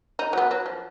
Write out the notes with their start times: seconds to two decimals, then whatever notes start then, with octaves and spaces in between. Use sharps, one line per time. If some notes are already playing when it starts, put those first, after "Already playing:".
0.19 D#4
0.33 F#3 B3
0.51 F#3
0.66 F3